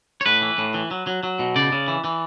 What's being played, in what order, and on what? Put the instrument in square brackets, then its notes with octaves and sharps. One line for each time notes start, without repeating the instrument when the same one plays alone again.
[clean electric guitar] C#5
A2 B4
E3
A2
E3
F#3
F#3
F#3
B2
C#3 D5
C#3
E3
E3